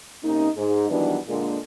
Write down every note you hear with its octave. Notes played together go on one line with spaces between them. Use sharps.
C3 A#3 C#4 D#4
G#2
D#3 E3 F#3 G3 B3 D4
A#2 D3 G#3